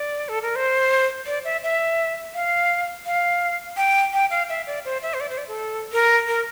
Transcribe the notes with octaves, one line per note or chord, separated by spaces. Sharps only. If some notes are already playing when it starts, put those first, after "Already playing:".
Already playing: D5
A4
A#4
C5
D5
E5
E5
F5
F5
G5
G5
F5
E5
D5
C5
E5
C5
D5
C5
D5
A4
A#4
A#4